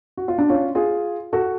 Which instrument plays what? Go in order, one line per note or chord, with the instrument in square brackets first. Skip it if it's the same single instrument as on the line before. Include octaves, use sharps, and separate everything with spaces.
[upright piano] F#4
F4
D4
C#4 F4
F4 G#4
F#4 A4